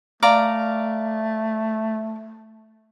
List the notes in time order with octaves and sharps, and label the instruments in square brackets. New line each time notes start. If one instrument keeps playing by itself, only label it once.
[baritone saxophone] A3 [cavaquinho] D5 F5 A#5